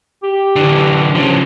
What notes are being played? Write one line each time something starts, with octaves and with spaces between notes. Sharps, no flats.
G4
D3 E3
C#3 F3